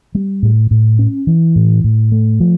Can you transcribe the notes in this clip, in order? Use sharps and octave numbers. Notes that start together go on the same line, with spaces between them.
G3
A2
A2
C#4
E3
A2
A2
A3
F3